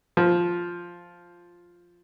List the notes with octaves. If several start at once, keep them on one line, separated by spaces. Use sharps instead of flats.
F3